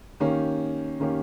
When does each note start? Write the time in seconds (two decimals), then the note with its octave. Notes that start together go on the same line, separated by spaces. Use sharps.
0.20 D#3 A#3 C#4 G4
1.00 D#3 A#3 C#4 G4